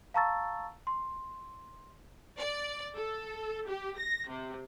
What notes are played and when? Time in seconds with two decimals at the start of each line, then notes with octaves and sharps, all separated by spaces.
0.14 F5 A5 A#5 C#6 E6 A6
0.87 C6
2.38 D5
2.94 A4
3.67 G4
3.97 A#6
4.28 C3